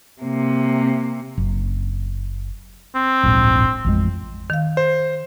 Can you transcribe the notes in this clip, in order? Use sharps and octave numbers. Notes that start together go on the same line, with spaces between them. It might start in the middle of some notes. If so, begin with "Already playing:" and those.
C3 A#3
F#1
C4
D1 A#1 G#2
A1 F2 G#3
D#3 F5
C5